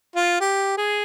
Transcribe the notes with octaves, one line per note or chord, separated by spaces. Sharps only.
F4
G4
G#4